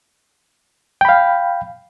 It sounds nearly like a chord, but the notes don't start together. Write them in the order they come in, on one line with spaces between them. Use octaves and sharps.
G5 B5 F5